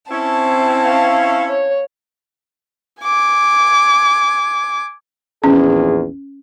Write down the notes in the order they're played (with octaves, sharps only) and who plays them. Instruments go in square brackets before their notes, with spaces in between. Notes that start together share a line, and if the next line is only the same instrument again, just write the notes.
[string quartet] C4 A5 [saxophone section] C#4 E4
[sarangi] F5
C#5
[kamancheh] G#5 D6
[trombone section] A#1 E2 G#4 [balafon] C#4